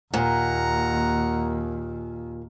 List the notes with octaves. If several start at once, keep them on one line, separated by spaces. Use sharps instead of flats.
D#2 A#2 F#5 A#5